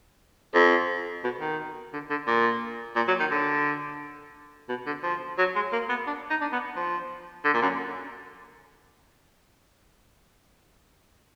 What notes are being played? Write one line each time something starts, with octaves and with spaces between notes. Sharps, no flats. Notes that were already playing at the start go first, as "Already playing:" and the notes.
F2
B2
D#3
D3
D3
A#2
A#2
F#3
D#3
D3
B2
D3
F3
F#3
G#3
A#3
B3
D4
D#4
D4
B3
F3
D3
A#2
F#2